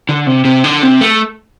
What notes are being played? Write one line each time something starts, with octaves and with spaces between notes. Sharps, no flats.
D3
C3
C3
D3
C3
A3